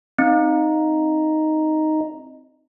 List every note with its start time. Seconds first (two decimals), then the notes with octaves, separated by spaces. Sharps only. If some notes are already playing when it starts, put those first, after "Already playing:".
0.19 C4 D#4